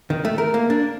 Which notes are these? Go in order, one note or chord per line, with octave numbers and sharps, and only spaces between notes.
D#3
A3
A#4
A#3
D4